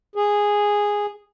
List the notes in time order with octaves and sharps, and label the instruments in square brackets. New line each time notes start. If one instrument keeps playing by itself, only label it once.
[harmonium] G#4